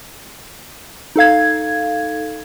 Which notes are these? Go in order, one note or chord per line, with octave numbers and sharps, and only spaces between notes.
D#4 A4 F5 G#6